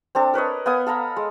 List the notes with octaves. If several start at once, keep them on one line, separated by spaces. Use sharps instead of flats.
C4 D4 A4
A#4 B4 C#5 D#5
B3 F5 G#5 D#6
A4 F5 A#5 B5
G#3